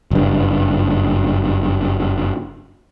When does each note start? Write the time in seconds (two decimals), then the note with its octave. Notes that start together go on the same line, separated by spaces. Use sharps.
0.11 F#1 G2